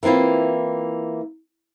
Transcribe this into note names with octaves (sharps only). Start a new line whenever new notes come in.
E3 A#3 C4 E4 F4